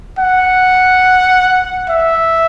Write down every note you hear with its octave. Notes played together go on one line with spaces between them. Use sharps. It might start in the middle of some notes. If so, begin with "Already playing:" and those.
F#5
E5